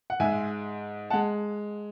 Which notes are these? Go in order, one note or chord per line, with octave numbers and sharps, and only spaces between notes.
F#5
G#2 G#3 E5 G#5
F#5 A5
G#3